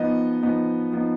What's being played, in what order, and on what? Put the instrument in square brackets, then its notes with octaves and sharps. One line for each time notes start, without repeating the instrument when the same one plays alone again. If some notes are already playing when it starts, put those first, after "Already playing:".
Already playing: [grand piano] F3 B3 D#4 D#5
F3 B3 D#4
F3 B3 D#4